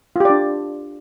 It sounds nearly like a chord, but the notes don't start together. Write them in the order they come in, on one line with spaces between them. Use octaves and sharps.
F4 G4 D5 D4